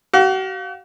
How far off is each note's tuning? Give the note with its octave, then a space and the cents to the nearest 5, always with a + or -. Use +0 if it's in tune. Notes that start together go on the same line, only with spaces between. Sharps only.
F#4 +45 F5 +25